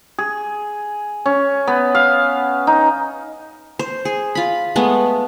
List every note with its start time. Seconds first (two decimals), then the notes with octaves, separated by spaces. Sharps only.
0.18 G#4
1.26 C#4
1.67 B3
1.95 F5
2.67 D#4
3.79 C5
4.05 G#4
4.35 F4 B5
4.76 G#3 A3 B3